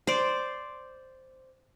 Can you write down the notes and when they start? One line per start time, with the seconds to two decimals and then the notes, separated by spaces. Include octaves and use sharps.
0.07 C5 D5